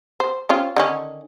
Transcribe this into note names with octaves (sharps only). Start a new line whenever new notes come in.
C5
C4 C#4 F4
D3 D#3 C#4